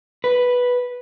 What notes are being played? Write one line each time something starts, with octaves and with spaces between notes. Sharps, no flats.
B4